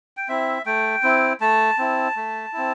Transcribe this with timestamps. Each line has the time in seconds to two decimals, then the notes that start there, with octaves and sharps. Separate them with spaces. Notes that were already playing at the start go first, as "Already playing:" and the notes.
0.17 G5
0.29 C4 E4 E5
0.66 A3 G5
1.03 C4 E4
1.41 A3 A5
1.78 C4 E4
2.16 A3
2.53 C4 E4